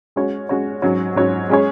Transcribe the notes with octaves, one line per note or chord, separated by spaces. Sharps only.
G#3 C#4 F#4 C#5
G#3 C#4 F#4 C#5
G#2 F#3 C#4 F#4 C#5
G#2 F#3 C#4 F#4 C#5
G#3 C#4 G#4 C#5